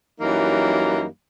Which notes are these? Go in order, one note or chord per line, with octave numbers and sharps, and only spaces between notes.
F#2 E3 F#3 G3 A#3 D#4